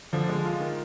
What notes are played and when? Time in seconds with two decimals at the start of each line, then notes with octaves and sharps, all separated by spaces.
0.13 D3 F3
0.29 G#3
0.45 F4
0.60 D#3